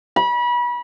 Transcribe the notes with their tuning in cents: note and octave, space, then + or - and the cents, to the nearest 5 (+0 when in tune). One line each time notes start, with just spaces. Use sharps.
B5 -30